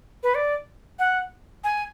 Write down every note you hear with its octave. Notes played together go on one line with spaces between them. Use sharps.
B4
D5
F#5
G#5